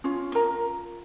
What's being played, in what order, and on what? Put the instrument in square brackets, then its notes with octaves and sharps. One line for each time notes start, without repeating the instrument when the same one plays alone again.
[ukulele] C#4 F4
A#4 A#5